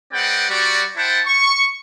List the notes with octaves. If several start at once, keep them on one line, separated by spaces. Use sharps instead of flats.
G#3 C4 B4 D5 F#5 G5
G3 F#4 D5
E4 C5 F#5 G5 A5
C#6